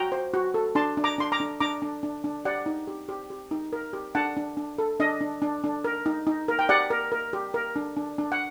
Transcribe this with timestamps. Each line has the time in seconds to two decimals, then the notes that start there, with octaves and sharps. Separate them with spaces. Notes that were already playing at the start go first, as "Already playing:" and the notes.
Already playing: F#4 G5 A#5
0.12 C5
0.34 F#4
0.54 A4
0.75 D4 A5 C6
0.97 D4
1.04 A#5 D6
1.18 D4 C6
1.32 A#5 D6
1.40 D4
1.60 D4 A#5 D6
1.82 D4
2.03 D4
2.24 D4
2.45 G4 D5 F#5
2.66 D#4
2.88 G4
3.09 G4
3.30 G4
3.51 D#4
3.73 A#4
3.93 G4
4.15 D4 F#5 A5
4.37 D4
4.57 D4
4.78 A4
5.00 D4 D#5
5.21 D4
5.42 D4
5.64 D4
5.84 A#4
6.06 D#4
6.27 D#4
6.48 A#4
6.59 G5
6.69 G4 D5 F#5
6.90 A#4
7.12 A#4
7.33 G4
7.54 A#4
7.76 D4
7.97 D4
8.18 D4
8.32 F#5